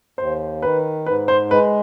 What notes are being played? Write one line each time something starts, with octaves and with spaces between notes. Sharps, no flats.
D#2 C5
D#3 B4
G#2 B4
C5
G#3 B4